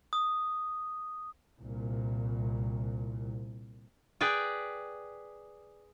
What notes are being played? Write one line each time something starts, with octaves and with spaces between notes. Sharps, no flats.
D#6
C2 A#2
G#4 B4 D5 G5